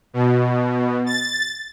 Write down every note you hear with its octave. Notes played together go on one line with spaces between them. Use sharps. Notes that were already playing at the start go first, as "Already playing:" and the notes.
B2
A6